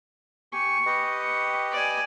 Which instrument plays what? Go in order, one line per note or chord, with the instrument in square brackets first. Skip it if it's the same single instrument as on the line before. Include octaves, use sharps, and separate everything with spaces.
[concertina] G4 G#5 [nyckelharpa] C#6
[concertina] G4 B4 D#5
[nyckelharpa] C#6
D5 G#5